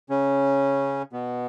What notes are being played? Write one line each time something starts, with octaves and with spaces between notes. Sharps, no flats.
C#3 C#4
B2 B3